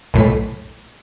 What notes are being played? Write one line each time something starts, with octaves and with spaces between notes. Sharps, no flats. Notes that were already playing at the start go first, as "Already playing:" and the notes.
B1 A2 B6